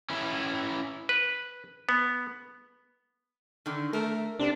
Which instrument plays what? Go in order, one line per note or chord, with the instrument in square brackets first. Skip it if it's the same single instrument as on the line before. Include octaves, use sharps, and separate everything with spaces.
[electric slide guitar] C#4 E4 B4
[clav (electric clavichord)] B4
B3
[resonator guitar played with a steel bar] D3 D#3
[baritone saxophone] A3 [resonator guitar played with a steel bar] A#4
[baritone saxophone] C3 [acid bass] D4